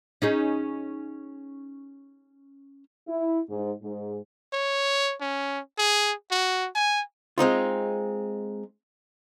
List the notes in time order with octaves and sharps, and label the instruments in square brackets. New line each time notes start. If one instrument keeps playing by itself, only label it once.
[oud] C#4 D#4 G#4
[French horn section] E4
G#2
G#2
[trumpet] C#5
C#4
G#4
F#4
G#5
[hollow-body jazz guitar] G#3 C4 D#4 F4